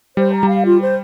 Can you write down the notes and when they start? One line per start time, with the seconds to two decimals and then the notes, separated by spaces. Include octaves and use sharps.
0.16 G3 C5
0.33 A#5
0.43 G3
0.48 F5
0.65 F4
0.81 C5